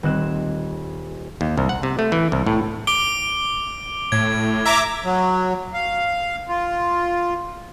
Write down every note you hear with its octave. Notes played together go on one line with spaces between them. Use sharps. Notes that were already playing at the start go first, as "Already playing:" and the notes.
D#1 C4 F#6 E7
D#2
C2
F#5
C3
A3
E3
C2
A2
D6 D7 G7
A2 G#6
E5 A#5 D6
F#3
F5
F4